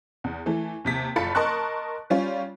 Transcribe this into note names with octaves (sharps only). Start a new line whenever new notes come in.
E2
E3 A3
D#2 C3 B6
F#1 F4 A4 B5 A6 C#7
A#4 D#5 A5 C6 C#6 F#6
G3 C#4 F4